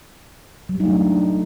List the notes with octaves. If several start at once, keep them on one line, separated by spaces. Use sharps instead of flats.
F#3
G3
D#4
A3
D4